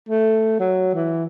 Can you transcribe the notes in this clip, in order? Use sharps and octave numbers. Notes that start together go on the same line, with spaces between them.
A3
F#3
E3